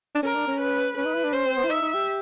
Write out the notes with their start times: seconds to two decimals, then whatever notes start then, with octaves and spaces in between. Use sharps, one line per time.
0.15 D4
0.23 C#4 A#4
0.36 D4
0.48 C#4
0.60 B4
0.97 C#4 B4
1.05 D#4
1.15 E4
1.24 D4
1.33 C#4 C5
1.46 C4
1.57 B3
1.64 E4
1.70 D#4 E5
1.82 D#4
1.94 G4